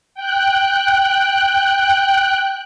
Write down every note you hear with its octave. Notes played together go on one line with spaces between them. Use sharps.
G5 F#6